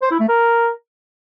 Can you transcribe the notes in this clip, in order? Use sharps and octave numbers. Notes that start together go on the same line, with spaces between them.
C5
E4
A3
A#4